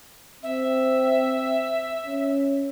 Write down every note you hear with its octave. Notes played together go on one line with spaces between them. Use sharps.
C4 E5
C#4